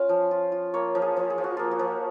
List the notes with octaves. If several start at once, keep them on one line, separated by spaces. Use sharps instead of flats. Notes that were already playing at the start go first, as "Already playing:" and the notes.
Already playing: C#4 F4 F5
F3
F4
F4
A#3 C#5
F3
G#4
F3
G#4
F3
F#4
A#3 F4
F#4
F3